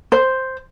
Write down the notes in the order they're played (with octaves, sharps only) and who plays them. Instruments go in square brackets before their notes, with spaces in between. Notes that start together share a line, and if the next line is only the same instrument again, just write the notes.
[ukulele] C5